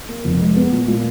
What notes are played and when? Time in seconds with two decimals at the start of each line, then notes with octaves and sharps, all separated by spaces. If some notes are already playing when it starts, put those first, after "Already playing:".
0.09 A#3
0.25 F1
0.40 G#3
0.56 B3
0.72 A#2
0.88 A#2